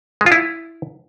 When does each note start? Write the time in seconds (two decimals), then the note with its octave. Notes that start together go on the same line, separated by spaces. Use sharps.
0.21 G#3
0.26 F4
0.32 E4